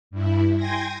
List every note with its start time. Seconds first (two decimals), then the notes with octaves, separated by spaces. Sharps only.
0.11 G2 E4
0.56 G5 G#5 C6 G#6 A#6